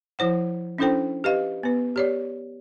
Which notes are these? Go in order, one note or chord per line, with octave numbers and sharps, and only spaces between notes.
F3 E4 C5 F#5
C#4 D4 E4 A4 C5 G5
G4 B4 D#5 F5
B3 B4
G4 C#5 D5